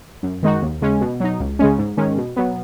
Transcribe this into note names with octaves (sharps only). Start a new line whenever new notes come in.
F#2
D#3 G#3 D#4 F#4
D#2
C#3 G#3 C#4
B2
F#3 D#4
C#2
C#3 G#3 C#4
G#2
D#3 G#3 C#4
B2
F#3 B3